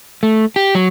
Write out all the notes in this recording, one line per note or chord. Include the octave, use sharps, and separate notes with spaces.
A3
G4
F#3